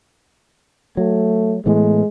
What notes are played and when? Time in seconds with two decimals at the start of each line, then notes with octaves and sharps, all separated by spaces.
0.97 F#3 A3
1.66 A2 E3 G#3 B3